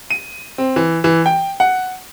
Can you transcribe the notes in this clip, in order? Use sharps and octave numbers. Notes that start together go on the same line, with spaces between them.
D#7
C4
E3
E3
G5
F#5